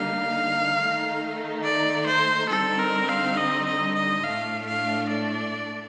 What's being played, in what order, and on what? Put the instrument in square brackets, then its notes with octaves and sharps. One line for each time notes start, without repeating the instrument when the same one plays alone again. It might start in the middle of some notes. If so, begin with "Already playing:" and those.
Already playing: [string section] D3 G3 A#3 D#4 [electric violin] F5
[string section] D#3 A3 D#4
[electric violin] D5
C5
[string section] D3 G3 C4 D#4 [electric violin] A4
[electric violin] A#4
F5
D#5
D#5
D#5
[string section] A2 A3 D4 [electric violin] F5
[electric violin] F5
D5